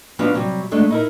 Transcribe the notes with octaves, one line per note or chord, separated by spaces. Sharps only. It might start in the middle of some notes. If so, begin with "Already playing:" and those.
F3 B3 D4 D#4 F#4 F5
C3 F#3 G3
D#2 G#3 A3 D4
D#4 E4 A#4